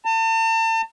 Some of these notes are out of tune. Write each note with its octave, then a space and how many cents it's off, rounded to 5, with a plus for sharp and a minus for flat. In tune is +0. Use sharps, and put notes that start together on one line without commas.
A5 +40